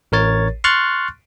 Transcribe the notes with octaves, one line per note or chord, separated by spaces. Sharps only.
A1 A#4 C#5 A6
C6 C#6 F6 F#6 A6